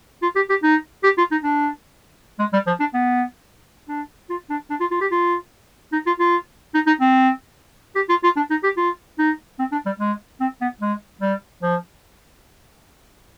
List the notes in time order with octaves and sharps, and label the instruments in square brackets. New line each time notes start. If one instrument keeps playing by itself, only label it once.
[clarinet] F4
G4
G4
D#4
G4
F4
D#4
D4
G#3
G3
F3
D4
B3
D4
F4
D4
D4
F4
F4
G4
F4
D#4
F4
F4
D#4
D#4
C4
G4
F4
F4
D4
D#4
G4
F4
D#4
C4
D4
G3
G#3
C4
B3
G#3
G3
F3